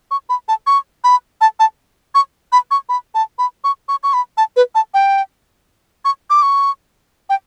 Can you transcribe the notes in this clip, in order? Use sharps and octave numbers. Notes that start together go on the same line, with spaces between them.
C#6
B5
A5
C#6
B5
A5
A5
C#6
B5
C#6
B5
A5
B5
C#6
C#6
C#6
B5
A5
B4
A5
G5
C#6
D6
C#6
G5